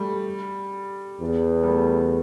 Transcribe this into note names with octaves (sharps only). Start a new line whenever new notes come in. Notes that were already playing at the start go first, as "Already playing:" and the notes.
Already playing: G3 A3
E2
G3
A3